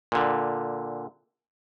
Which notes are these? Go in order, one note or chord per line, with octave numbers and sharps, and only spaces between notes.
A#2 D3